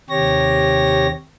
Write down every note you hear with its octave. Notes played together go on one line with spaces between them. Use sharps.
D#2 C3 G4 C#5 A#6